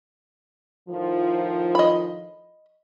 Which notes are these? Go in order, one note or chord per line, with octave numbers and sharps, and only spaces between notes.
A2 D#3 F3
D#5 B5